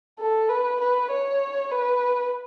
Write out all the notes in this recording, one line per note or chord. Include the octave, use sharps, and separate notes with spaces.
A4
B4
B4
C#5
B4